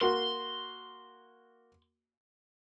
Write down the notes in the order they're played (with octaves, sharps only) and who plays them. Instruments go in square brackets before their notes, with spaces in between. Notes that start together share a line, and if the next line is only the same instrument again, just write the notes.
[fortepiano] A#3 F#4 [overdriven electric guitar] C6